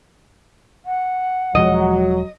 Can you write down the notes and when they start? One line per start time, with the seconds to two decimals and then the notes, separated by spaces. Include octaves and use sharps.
0.85 F#5
1.55 E1 F3 F#3 G#3 D#5